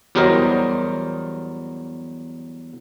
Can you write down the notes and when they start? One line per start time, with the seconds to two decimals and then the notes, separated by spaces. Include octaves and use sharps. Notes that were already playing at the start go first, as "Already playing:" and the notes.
0.15 E2 F#3 G3 A#4 C5 D#5